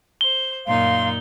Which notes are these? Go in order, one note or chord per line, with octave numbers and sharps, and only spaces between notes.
C5 G7
F#2 A#2 D#4 F5 C6